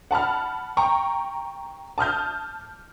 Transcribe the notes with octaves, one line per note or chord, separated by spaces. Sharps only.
F#5 A5 B5 F6
G5 A#5 C#6
A5 D#6 F6 G6